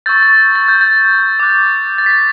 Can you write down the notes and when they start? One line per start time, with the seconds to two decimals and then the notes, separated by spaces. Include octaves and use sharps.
0.06 C#6 E6 G6 A6
0.23 A6
0.55 A6
0.68 G6
0.81 A6
1.39 D6 F#6
1.98 A6
2.06 B6